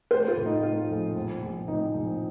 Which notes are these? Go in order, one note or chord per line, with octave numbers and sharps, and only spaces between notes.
A3 C5
F4
A2
D#4
A3 F4
A#1
A#1
A#1
A2 D#4
A#1